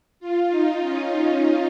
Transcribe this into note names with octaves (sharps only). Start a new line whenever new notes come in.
F4
D#4
C#4